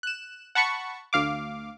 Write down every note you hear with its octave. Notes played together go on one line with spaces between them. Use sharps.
F#6 E7
F#5 A5 B5 C#6 C#7
D2 F5 D6